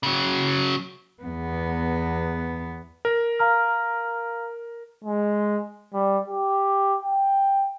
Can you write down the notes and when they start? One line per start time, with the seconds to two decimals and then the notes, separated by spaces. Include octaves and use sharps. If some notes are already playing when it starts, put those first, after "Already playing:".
0.03 C#3 F#3
1.23 E2 B3
3.05 A#4
3.39 F5 A#5 F6
5.04 G#3
5.94 G3
6.28 G4
7.03 G5